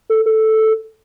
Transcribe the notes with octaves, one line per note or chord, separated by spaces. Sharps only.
A4
A4